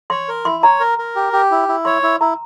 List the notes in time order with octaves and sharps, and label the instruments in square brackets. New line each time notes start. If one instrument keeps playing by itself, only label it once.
[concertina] C#5 [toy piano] C6
[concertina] A#4
[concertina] E4 [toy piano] C6
[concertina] C#5 [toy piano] A#5
[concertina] A#4
A#4
G4
G4
E4
E4
[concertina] C#5 [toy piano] C6
[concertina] E4
[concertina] E4 [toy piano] A#5